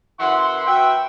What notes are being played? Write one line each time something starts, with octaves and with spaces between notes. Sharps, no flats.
F#2 E3 E4 F#5 C6
F#4 B4 E5 G5